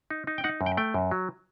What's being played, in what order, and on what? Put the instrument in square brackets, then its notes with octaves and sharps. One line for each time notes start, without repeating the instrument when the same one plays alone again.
[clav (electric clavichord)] D#4
D#4
G5
D#4 F#5
F#2
G5
A3 G5
F#2
F#3